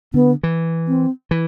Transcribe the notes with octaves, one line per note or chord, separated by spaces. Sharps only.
D3 B3
E3
C4
E3